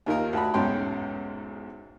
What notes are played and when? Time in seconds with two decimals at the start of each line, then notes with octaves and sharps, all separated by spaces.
0.06 D#2 D#3 F4 A#4
0.33 D2 A5 B5
0.54 B1 E2 G#2 C#4 G5 C6